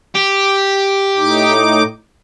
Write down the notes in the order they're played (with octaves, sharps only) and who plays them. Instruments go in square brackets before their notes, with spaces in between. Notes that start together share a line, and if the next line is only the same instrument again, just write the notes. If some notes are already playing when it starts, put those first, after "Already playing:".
[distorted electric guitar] G4
[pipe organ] A2 D#4 D6